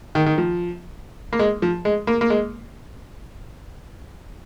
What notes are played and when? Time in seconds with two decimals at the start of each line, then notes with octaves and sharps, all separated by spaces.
0.15 D#3
0.26 D#3
0.38 F3
1.33 A#3
1.39 G#3
1.62 F3
1.85 G#3
2.07 A#3
2.21 A#3
2.30 G#3